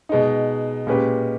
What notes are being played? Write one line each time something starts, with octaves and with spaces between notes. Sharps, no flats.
B2 G#3 D#4
A#2 G#3 C#4 G4 B4